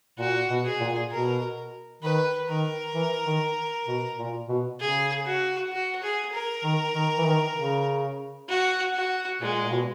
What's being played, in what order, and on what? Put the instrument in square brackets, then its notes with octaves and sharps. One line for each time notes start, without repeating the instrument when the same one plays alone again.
[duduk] A#2 [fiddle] F#4
[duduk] B2
[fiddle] G#4
[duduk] A#2
[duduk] B2 [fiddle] A#4
[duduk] D#3 [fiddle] B4
[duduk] D#3 [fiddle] A#4
[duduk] E3
D#3
B2
A#2
B2
[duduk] C#3 [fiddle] G#4
[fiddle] F#4
F#4
G#4
A#4
[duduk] D#3
D#3
E3
D#3
C#3
[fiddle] F#4
F#4
[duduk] A#2 [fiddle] G#3
[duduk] A#2
B2